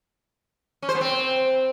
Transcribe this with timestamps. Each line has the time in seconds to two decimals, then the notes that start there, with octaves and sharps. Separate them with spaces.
0.82 C#4
0.89 C5
0.95 B3
1.01 C4